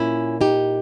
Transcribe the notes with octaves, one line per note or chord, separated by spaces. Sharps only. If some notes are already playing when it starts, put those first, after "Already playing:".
Already playing: A#2 A#3 C#4 E4
D#4 G4